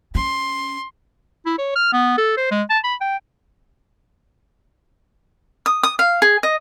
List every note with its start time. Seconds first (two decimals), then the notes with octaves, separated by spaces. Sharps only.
0.15 C#4 C6
1.46 E4
1.58 C#5
1.76 F6
1.93 B3
2.18 A4
2.37 C5
2.51 G#3
2.70 A5
2.84 B5
3.01 G5
5.66 D#6
5.83 D#6
5.99 F5
6.22 G#4
6.43 D#5